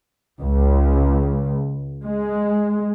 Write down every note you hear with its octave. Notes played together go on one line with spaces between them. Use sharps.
C#2
G#3